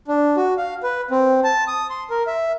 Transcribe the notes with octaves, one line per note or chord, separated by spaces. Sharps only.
D4
F#4
F5
B4
C4
A5
D#6
C6
A#4
E5